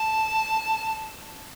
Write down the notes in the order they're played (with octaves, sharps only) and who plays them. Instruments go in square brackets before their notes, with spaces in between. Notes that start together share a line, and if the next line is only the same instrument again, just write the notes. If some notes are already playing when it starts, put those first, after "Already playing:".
Already playing: [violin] A5